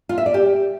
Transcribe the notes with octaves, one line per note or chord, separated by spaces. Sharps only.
F4
E5
D5
G4